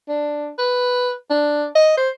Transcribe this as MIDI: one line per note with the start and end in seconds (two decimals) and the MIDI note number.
0.08 0.49 62
0.58 1.12 71
1.30 1.66 62
1.75 1.93 75
1.97 2.09 72